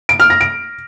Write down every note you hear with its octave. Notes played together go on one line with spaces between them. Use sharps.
D7
F6
A#6
D7